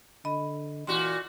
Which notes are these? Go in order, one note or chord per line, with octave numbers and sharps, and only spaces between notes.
D3 D#5 B5
A#2 E3 F#4 C6